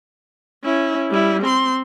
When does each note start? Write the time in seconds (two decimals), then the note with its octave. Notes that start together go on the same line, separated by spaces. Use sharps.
0.64 C#4 E4
1.10 G3 E4
1.43 C4 C6